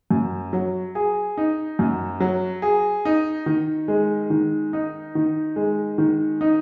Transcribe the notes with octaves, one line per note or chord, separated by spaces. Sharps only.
F#2
F#3
G#4
D#4
F#2
F#3
G#4
D#4
D#3
G#3
D#3
D#4
D#3
G#3
D#3
D#4